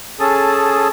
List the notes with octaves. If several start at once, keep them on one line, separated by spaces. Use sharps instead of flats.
C#4 G#4 A4 A5 D#6